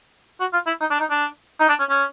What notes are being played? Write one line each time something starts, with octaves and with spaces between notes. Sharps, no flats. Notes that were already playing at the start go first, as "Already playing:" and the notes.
F#4
F4
E4
D#4
D4
D#4
D4
D#4
D4
C#4
C#4